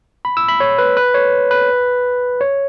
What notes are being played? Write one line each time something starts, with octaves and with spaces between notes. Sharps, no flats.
B5
E6
B5
C#5
B4
B4
C#5
B4
C#5